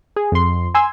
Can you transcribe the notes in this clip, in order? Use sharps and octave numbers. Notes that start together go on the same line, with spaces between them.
G#4
F2 C6
G#5 C6 E6 G#6